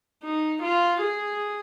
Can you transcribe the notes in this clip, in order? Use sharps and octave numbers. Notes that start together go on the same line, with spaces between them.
D#4
F4
G#4